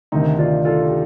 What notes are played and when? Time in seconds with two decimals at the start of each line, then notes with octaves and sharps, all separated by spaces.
0.12 D2 C3 D#3 C4 D#4
0.38 D4 F4
0.65 F4 A4
0.85 G4